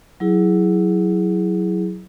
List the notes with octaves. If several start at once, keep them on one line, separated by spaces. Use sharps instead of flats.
F#3 E4 G#4